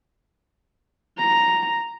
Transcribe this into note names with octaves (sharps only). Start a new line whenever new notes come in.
A#5